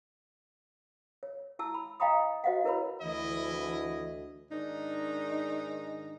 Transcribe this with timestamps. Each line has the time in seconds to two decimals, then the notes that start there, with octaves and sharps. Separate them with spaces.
1.23 C#5
1.59 E4 A5 E6
1.74 B5
2.00 D#5 F5 G5 A#5 B5 D#6
2.44 F#4 C5 D#5 F5 F#5
2.64 E4 A#4 B4 C#5 B5
3.02 D2 E3 E4 D#5
4.51 G#2 D#3 D4 D#4